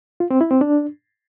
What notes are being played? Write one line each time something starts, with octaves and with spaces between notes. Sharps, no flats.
F4
C4
E4
C4
D4